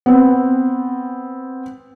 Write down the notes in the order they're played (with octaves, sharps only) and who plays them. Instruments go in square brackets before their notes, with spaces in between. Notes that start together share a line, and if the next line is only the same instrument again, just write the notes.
[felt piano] B3 C4